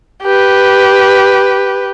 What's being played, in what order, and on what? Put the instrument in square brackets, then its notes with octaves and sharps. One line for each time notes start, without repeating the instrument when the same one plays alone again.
[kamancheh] G4 B4